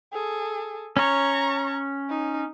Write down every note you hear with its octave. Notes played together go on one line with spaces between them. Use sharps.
G#4 A4
C#4 C#5 A#5 C#6
D#4